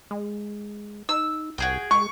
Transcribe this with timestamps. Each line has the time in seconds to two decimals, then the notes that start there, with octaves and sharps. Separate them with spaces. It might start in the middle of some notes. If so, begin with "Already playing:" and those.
0.11 G#3
1.09 D#4 E6
1.58 C2 F#4 G#4 G5
1.91 G#3 C#6